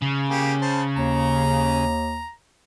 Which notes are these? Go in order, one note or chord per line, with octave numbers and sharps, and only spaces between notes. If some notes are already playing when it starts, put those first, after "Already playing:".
C#3
A#3 G4 G#4
C5 A5
D#2 A#5